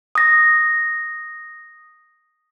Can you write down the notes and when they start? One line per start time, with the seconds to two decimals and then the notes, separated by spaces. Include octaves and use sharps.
0.15 D#6 A#6